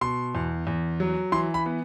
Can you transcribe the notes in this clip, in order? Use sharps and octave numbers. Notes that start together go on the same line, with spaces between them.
B2 C6
E2
E2
F#3
E3 C6
B5
B3